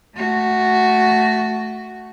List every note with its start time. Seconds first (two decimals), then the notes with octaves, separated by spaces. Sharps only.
0.16 A3 F#4